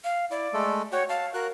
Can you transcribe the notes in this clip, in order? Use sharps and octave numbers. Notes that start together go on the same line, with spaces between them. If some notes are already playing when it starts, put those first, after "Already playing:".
F5
E4 D5
G#3 A3 A4
F#4 C#5 F#5 G5
F5 A5
F#4 A#4 F#6